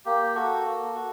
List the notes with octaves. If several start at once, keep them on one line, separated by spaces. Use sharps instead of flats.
A#3 G4
F#4 A4
A#3
F#4